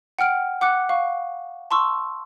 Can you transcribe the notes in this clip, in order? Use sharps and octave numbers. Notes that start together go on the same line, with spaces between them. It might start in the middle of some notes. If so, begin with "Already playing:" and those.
F#5 G5 F6 D7
F#5 D6 F#6 C#7
F5 C#6
A5 C6 C#6 E6